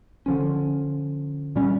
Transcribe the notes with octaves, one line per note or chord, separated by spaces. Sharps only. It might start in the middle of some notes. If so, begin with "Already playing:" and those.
D3 F3 C#4
A#2 G3 C#4